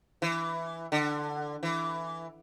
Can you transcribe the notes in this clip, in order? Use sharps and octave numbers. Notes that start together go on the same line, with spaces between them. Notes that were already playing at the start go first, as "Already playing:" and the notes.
E3
D3
E3